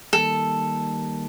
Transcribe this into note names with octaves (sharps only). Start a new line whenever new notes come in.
D#3 G3 A#3 A4